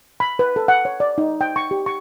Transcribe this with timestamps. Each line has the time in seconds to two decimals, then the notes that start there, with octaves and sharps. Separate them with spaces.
0.20 B5
0.39 B4
0.56 A4
0.68 F#5
0.85 C#5
1.00 D5
1.18 D#4
1.41 G5
1.56 C#6
1.71 G4
1.86 C#6